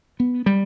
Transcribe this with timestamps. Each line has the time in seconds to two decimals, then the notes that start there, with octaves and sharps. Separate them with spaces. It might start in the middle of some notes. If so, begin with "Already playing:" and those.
0.20 B3
0.46 G3